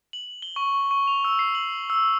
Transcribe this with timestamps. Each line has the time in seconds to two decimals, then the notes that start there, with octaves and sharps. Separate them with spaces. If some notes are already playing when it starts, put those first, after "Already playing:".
0.13 F#7
0.42 G7
0.56 C#6
0.91 C#6
1.07 F7
1.25 E6
1.39 C7
1.55 F#7
1.90 E6